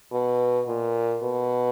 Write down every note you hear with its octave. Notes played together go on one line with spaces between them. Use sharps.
B2
A#2
B2